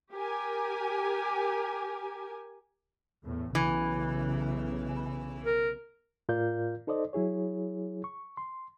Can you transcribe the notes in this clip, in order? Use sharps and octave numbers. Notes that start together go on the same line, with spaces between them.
G4 A#4 G#5
E2 A2
B1 C#3 E3
A#4
A2 F4 A#4 D5 F5 G6
D#4 A4 C5 D5 D#5
F#3 E4 G#4 C#5
C#6
C6